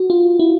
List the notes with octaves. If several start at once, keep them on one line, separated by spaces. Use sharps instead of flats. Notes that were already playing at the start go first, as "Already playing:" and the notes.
Already playing: F#4
F4
E4